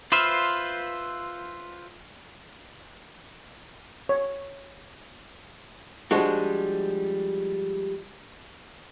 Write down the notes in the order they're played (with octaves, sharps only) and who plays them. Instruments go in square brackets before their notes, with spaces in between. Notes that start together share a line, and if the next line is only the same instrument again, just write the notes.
[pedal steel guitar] F4 B4 C5 E5 F5
[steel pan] C#5
[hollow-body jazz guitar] F3 G3 G#3 D4 F#4